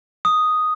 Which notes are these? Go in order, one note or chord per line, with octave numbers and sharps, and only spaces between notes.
D#6